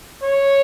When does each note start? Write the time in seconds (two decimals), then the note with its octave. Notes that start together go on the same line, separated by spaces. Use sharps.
0.23 C#5